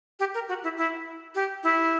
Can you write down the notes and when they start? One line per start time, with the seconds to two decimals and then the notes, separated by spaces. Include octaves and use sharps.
0.20 G4
0.34 A#4
0.49 F#4
0.63 E4
0.77 E4
1.35 G4
1.63 E4